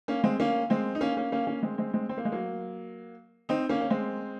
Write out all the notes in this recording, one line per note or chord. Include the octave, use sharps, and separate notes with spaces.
A#3 C#4
G#3 C4
A#3 C#4
G#3 C4
D#4
A#3 C#4
A#3 C#4
A#3 C#4
A#3 C#4
G#3 C4
G#3 C4
G#3 C4
C4
A#3
G#3
F#3 A#3
C4 D#4
A#3 C#4
C#4
G#3 C4